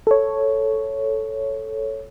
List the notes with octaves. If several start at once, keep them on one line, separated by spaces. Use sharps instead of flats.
A4 C#5